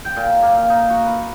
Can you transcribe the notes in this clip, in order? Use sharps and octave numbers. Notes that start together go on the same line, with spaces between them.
G5
A#2
A#3
F5
D#4
F#4
B4